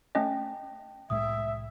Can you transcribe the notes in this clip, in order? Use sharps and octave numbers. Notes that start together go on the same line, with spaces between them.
A3 C#4 D#5 G5 A5
C2 A2 G#3 E5 D#6